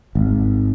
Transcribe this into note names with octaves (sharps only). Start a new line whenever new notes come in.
G#1